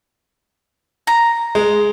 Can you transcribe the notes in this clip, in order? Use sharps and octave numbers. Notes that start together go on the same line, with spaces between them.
A#5
G#3